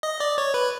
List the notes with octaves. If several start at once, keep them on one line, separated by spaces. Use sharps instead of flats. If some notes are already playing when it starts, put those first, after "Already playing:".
D#5
D5
C#5
B4